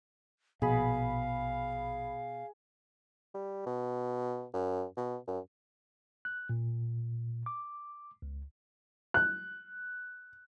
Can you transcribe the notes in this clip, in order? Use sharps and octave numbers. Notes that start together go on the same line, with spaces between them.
A#1 B2 G#4 F5 B5
G3
B2
F#2
B2
F#2
F#6
A#2
D6
C#2
F#6